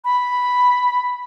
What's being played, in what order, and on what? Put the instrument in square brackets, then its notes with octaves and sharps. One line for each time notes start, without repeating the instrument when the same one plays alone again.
[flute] B5